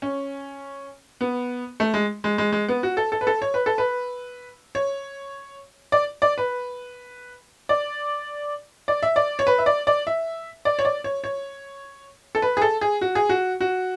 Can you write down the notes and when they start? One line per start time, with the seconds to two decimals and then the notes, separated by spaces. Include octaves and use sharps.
0.02 C#4
1.21 B3
1.80 A3
1.94 G#3
2.24 G#3
2.38 G#3
2.53 G#3
2.68 B3
2.83 F#4
2.97 A4
3.12 A4
3.21 B4
3.27 A4
3.42 C#5
3.54 B4
3.66 A4
3.78 B4
4.75 C#5
5.92 D5
6.22 D5
6.38 B4
7.69 D5
8.88 D5
9.03 E5
9.16 D5
9.39 C#5
9.47 B4
9.58 E5
9.66 D5
9.87 D5
10.07 E5
10.65 D5
10.79 C#5
10.85 D5
11.04 C#5
11.24 C#5
12.35 A4
12.42 B4
12.57 G#4
12.62 A4
12.81 G#4
13.01 F#4
13.15 G#4
13.29 F#4
13.61 F#4